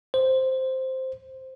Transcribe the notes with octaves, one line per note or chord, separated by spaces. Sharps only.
C5